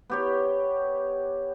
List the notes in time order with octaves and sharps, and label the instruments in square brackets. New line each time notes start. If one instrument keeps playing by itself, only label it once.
[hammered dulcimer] B3 G4 C#5